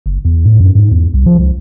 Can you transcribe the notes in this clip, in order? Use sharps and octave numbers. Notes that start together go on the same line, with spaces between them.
F#1
E2
A2
F#2
G#2
E2
C2
F3
C#2